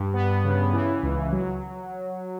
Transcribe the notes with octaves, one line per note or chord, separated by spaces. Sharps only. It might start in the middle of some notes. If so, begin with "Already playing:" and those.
Already playing: G2
B3
C#3
E3
C#2
F#3